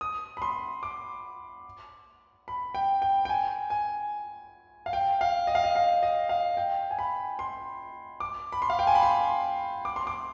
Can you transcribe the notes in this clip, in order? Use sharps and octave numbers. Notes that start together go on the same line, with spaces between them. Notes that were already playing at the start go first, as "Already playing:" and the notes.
D#6
B5
C6
D6
B5
G5
G5
G5
G#5
G#5
F5
G5
F5
D#5
F5
D#5
F5
D#5
F5
G5
G#5
B5
C6
D6
B5
C6
F5
G5
G#5
B5
C6
D6
C6
D6